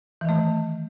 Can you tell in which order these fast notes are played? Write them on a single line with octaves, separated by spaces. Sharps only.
E3 D#3 A3